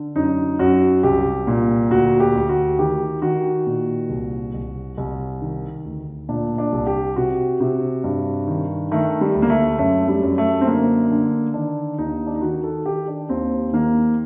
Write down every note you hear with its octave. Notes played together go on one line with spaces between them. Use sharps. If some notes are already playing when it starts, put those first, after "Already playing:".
Already playing: D3
F#2 D#4
F#2 F#4
C2 G4
A#2
D2 F#4
G4
D2
F#4
D#3 G4
D#3 F#4
A#2
C2
C2
C2
D#3
D2
A#2 D4
D4
C2
G4
C3 F#4
C3
G2
D#3
D#3 A3
G3
D2
A#3
A3
F#2 A3
G3
F#2
A3
C4
D3 A#3
D3
D#3 D4
D#2 D#4
D4
D#4
D#3 F#4
A4
D#3 G4
D4
D#2 C4
D#3 A#3